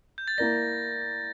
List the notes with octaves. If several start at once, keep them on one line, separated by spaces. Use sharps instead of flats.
G6
A6
A#3 E4 A#4 D5 A#6